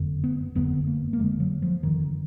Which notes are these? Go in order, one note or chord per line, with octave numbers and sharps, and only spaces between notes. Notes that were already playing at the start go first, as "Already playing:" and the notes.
Already playing: F#1 F2 D3
B3
F#1 F2 D3 B3
A#3
A#3
F#1 F2 D3 G#3
F#3
F3
F#1 F2 D3 D#3